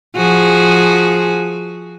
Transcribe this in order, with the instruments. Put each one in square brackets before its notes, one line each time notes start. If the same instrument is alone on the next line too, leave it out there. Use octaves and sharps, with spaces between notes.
[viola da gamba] F3 F#4 G#4